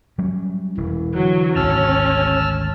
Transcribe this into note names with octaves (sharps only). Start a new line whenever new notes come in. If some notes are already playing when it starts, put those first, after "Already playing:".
F#3 G3 C#4
E1 E3
D3 F#3
G#1 D2 B2 C#4 A5 E6 F6